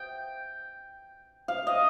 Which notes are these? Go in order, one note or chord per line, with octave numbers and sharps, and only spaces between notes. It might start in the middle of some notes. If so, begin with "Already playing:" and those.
Already playing: G5
F5
D#5